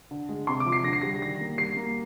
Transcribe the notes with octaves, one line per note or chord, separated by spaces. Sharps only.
D3
G#3
C3 C6
D6
F3
C7
D3 A#6
C7
G3 A#6
D#3 A#6
A#3
G3 C7
A#3